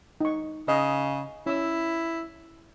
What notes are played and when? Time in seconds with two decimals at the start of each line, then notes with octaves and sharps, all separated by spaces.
0.21 D#4 C#6
0.68 C#3 D#5
1.46 C#4 E4 E6